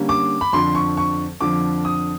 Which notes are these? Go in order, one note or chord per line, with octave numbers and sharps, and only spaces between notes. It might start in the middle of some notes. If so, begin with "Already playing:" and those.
Already playing: D3 G3 A#3 C#4
D6
B5
F2 D3 F3 C6
C#6
C#6
F2 D3 F3 D6
D#6